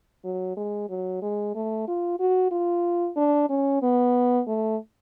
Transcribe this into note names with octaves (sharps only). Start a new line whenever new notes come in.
F#3
G#3
F#3
G#3
A3
F4
F#4
F4
D4
C#4
B3
A3